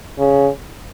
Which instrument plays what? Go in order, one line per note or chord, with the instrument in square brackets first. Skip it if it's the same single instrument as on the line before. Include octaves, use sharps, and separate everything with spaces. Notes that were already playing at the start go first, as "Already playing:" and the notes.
[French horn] C#3